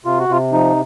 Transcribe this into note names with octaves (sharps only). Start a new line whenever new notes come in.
C3 F4
F#4
C3 F4
F3 D#4